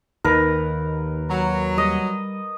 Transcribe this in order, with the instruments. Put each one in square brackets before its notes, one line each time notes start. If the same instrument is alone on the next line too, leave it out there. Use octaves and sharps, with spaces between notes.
[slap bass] D#2 D#3 [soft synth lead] D#4 [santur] A#4 B4
[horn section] F#3 [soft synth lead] A#5
[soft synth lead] G3 [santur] D#5